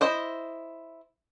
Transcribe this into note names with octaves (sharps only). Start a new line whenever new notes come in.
E4 C5 D#5